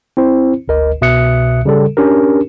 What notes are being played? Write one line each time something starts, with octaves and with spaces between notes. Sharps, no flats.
C4 E4 C5
G1 D2 A#4 D#5
C2 B2 E5 D#6 F#6 C#7
C#3 G3 A4
C#4 D4 G4 A#4